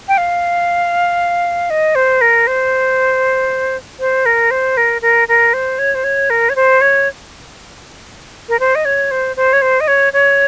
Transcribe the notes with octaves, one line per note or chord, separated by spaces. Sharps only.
G5
F5
D#5
C5
A#4
C5
C5
A#4
C5
A#4
A#4
A#4
C5
C#5
C5
C#5
A#4
C#5
C5
C#5
A#4
C5
D#5
C#5
C5
C5
C#5
C5
D#5
C#5
C#5